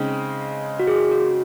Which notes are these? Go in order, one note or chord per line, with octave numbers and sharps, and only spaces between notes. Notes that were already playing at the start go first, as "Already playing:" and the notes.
Already playing: C#3 G#3 C4 D#4
F#4
G#4
F#4